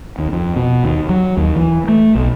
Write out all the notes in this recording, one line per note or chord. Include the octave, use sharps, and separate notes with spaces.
D#2
F2
B2
D#2
F#3
D#2
E3
A3
B1